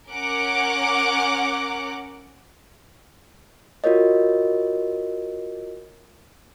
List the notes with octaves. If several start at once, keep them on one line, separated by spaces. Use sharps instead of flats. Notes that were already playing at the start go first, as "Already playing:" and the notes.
C#4 A#4 F#5 D6
F4 F#4 A#4 C#5 D#5